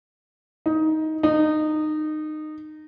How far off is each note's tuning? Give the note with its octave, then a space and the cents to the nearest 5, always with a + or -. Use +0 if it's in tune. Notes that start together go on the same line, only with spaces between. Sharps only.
D#4 +15
D#4 -20